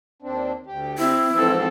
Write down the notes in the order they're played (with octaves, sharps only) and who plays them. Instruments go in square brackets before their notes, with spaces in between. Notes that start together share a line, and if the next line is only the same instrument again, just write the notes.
[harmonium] D#2 C4 D4
D2 G4
[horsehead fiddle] C4 [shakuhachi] E4
[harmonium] G#2 E3 F3 [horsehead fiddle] C4 A4